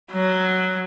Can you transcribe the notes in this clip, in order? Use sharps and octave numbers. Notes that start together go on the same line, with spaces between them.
F#3